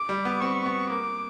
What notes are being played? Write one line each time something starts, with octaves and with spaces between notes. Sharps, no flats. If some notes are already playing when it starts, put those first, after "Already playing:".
Already playing: D6
G3
B3
C4 C#6
B3
A#3 D6